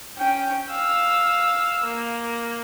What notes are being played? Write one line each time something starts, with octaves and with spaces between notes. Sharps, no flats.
C#4 G5
F5 E6
A#3